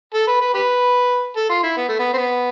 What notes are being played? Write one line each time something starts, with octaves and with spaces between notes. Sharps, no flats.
A4
B4
B4
G4 B4
A4
F4
E4
B3
A3
B3
C4
B3